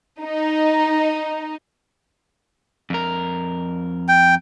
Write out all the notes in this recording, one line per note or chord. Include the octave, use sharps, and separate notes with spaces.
D#4
F2 A#4
G5